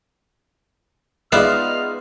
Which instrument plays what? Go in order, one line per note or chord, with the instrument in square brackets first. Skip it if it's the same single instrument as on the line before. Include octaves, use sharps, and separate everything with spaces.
[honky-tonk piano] G#3 D#4 F4 [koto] B3 [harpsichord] D5 E5 F5 [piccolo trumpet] F6